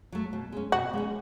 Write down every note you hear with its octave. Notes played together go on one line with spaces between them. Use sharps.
F#3 A3
B2
G#3 C#4
B2 F#4
G#3 C#4